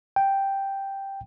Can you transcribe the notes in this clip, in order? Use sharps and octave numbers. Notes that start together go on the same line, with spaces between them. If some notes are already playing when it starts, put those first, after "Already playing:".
G5